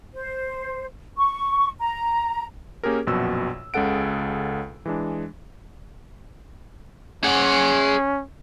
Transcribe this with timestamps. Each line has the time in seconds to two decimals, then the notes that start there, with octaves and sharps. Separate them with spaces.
0.13 C5
1.17 C#6
1.79 A#5
2.83 A#3 C#4 G4 G#4 A#4
3.07 A#1 F#2 B2 F#4 E6
3.74 C#2 C#3 G#3 A4 F#5 D7
4.86 E3 G#3 D4
7.24 C#4 G#4 F#5